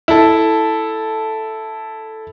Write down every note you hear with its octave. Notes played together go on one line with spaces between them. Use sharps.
E4 A4